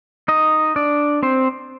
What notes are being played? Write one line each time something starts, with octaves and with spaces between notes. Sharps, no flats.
D#4 D#5
D4 D5
C4 C5